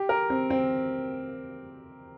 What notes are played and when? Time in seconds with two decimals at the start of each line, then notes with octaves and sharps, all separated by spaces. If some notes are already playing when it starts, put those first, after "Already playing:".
Already playing: G4
0.09 A#4
0.30 C4
0.50 C4